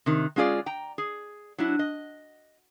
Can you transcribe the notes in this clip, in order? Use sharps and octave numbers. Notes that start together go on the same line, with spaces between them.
C3 D#3
G#3 C#4 F4 G#4 D5
G5 A#5
G#4
F#3 D4 E4
D#5